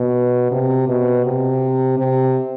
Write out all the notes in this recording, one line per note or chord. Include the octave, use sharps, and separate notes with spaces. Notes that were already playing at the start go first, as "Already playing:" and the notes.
Already playing: B2
C3
B2
C3
C3